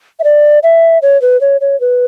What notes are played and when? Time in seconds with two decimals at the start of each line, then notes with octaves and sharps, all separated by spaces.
0.20 E5
0.24 D5
0.63 E5
1.02 C#5
1.22 B4
1.41 C#5
1.61 C#5
1.80 B4